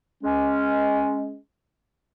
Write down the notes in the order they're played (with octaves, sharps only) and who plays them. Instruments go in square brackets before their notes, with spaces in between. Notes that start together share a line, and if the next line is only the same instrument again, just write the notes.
[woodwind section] G#3 C#4